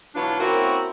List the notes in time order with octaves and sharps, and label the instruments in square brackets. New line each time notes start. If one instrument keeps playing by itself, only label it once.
[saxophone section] B2 E3 F#3 B3 D4 F4
A#3 C4 C#4 E4 F#4 A#4